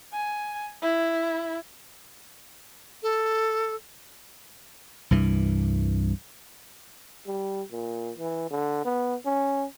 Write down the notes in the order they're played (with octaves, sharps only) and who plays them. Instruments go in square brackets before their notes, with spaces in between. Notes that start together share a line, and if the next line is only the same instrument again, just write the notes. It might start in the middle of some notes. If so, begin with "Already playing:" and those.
[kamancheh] G#5
E4
[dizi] A4
[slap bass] C2 G2 E3
[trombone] G3
A#2
E3
D3
B3
C#4